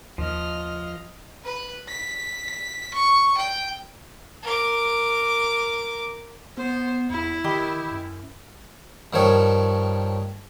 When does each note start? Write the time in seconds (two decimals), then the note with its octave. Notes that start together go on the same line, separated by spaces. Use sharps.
0.18 D#2 F3 D#5 F6
1.44 B4
1.88 B6
2.94 C#6
3.37 G5
4.43 A#4 D6
6.57 B3 C5
7.10 E2 E4
7.44 D#3 G4 D#5 B5
7.92 F#2
9.13 G2 D#3 F3 C#5